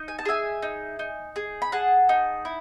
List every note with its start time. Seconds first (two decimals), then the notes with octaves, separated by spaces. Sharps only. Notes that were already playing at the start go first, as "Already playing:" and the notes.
Already playing: D#4
0.08 G#5
0.19 A5
0.25 G#4 E5 G#5
0.63 D#4
0.99 D#4
1.36 G#4
1.62 B5
1.72 G#4 F#5 A5
2.09 D#4
2.45 E4